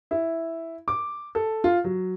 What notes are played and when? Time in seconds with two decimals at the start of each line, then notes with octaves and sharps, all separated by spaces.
0.11 E4
0.88 D6
1.35 A4
1.64 F4
1.84 F#3